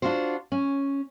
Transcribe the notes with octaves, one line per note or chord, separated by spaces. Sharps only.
D4 D#4 F4 F#4 C5
C#4